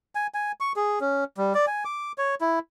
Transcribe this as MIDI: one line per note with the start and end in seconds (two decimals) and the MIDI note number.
0.15 0.27 80
0.34 0.52 80
0.60 0.72 85
0.76 0.99 68
1.01 1.24 61
1.38 1.53 55
1.55 1.66 74
1.67 1.84 80
1.85 2.12 86
2.18 2.35 73
2.41 2.59 64